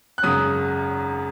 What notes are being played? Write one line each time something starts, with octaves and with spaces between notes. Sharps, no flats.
F#6
G#1 F#2 C#3 D#6